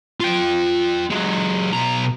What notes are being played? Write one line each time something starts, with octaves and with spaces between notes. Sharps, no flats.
F4 G5
F#3 G#3
B1 A#5